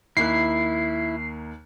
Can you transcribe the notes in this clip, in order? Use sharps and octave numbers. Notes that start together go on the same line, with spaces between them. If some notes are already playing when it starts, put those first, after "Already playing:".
D#2 A#3 E4 F#6 C7